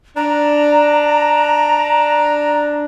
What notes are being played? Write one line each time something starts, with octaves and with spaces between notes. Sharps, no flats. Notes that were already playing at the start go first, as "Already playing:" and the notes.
D4 A#5